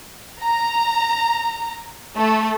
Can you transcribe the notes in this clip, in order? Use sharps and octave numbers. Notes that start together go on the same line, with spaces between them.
A#5
A3